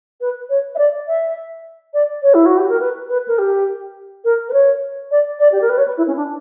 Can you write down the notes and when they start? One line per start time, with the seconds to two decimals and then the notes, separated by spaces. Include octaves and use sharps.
0.21 B4
0.50 C#5
0.75 E5
0.78 D5
1.08 E5
1.94 D5
2.23 C#5
2.34 E4
2.46 F#4
2.58 G4
2.69 A#4
2.80 B4
3.09 B4
3.28 A#4
3.38 G4
4.25 A#4
4.49 B4
4.53 C#5
5.11 D5
5.40 D5
5.52 G4
5.61 A#4
5.69 B4
5.78 C#5
5.87 B4
5.97 E4
6.07 C#4
6.17 D4